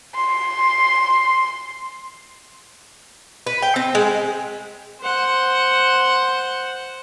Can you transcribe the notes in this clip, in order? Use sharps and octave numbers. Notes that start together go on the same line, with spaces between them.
C6
B4
G5
C4
G#3
C5 F#5